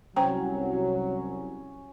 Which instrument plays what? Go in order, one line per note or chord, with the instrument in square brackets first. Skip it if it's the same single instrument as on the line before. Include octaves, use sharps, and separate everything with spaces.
[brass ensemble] C2 F#3 [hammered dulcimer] C#4 [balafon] C5 G5 A#5